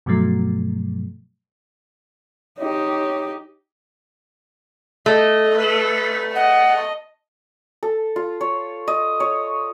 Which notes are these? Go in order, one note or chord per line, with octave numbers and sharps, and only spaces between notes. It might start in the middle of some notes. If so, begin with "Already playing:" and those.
G2 B2 F3 F#3 A3
D#4 G4 C#5
A3 D#5
B4
D#5 F#5
A4
F4
C#5
D#5
C#5